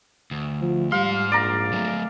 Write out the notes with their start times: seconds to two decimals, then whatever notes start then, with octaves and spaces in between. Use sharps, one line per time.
0.31 D2
0.62 F3
0.92 G#2 G3 F5 C6
1.32 A#1 D5 A#5
1.73 F#3 A3